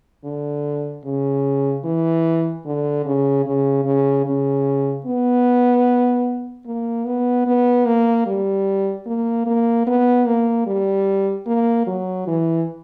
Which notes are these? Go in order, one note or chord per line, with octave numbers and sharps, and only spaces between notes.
D3
C#3
E3
D3
C#3
C#3
C#3
C#3
B3
A#3
B3
B3
A#3
G3
A#3
A#3
B3
A#3
G3
A#3
F#3
E3